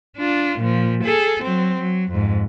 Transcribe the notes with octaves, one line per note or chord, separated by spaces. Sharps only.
D4 F4
A#2 F3
G#4 A4
F#3 C4
F#3
F2 G#2